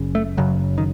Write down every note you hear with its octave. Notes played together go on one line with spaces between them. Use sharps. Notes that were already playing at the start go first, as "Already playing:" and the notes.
Already playing: F#1 F#2 C#3
A3
F#1 F#2 C#3 F#3
D#3